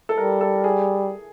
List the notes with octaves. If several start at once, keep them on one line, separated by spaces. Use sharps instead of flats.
A4
G3 A#4
A4
G#4